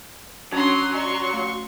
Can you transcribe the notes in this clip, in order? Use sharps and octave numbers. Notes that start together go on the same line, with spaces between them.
F#3 C#4 D4 A#5 C6 D#6
D5 D#5 G#5 C6 C#6
A3